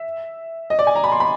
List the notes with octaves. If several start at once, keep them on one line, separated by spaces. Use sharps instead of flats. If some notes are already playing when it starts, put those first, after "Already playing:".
Already playing: E5
D#5
D5
G#5
A#5
B5
C6
B5